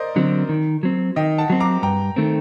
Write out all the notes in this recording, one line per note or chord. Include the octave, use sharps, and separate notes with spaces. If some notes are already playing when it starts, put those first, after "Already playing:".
Already playing: A#4 C5 D5 D#5
D3 F#3 C4
D#3
F#3 C4
D#3 D#5 G5
F#5 A5
F#3 C4
A#5 D6
G2 G5 A#5
D#3 A3 C4